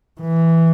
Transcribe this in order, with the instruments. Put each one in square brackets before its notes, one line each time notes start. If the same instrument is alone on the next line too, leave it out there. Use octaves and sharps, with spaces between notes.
[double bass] E3